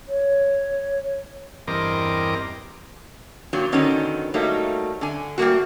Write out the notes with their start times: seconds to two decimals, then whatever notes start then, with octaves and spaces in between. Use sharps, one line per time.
0.08 C#5
1.67 E2 G2 C4 A#4 D#5 D6
3.53 G2 A#2 F#3
3.72 D3 D#3 F#3 B3 C#4 D#4
4.34 F#3 G3 A3 A#3 D#4
5.01 D3 G#5
5.38 G3 A3 A#3 F#4